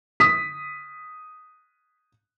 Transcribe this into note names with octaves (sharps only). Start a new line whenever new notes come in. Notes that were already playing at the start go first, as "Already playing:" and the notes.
D#6 B6